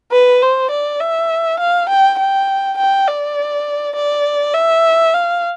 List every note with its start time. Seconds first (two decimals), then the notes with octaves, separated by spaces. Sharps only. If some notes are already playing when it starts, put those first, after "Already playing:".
0.12 B4
0.42 C5
0.71 D5
1.00 E5
1.59 F5
1.89 G5
2.19 G5
2.78 G5
3.07 D5
3.96 D5
4.54 E5
5.14 F5